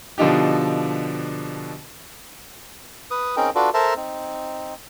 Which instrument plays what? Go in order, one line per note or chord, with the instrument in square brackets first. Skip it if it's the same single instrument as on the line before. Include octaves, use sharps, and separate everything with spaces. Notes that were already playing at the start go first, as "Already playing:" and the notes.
[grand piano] B2 D3 F3 D4 D#4 G4
[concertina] B4 D#6
C4 C#4 D#4 G#4 A#4 G5
D4 F4 F#4 A4 B4 D5
A4 A#4 C5 E5 A5 A#5
C4 D#4